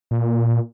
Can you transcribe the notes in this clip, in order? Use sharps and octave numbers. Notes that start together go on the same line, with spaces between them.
A#2